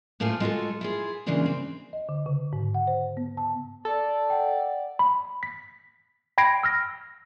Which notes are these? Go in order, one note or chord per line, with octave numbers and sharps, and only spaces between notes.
A2 A3 A#3 C4 F4 G#5
G#3 F4 F#4 A4
E4 F4 G#4
C#3 E3 G#3 A#3 D4 F4
C4
D#5
D3
C#3
G#2
F#5
C5
B3
A5
A4 D5
F#5 G5
B5
B6
G5 B5 G#6 A#6 C7 D7
E6 F6 A#6